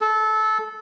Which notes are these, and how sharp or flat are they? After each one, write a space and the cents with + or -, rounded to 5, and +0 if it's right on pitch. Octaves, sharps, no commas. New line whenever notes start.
A4 -20